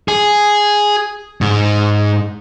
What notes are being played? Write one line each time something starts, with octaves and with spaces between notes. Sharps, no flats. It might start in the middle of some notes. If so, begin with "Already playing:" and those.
G#4
G#2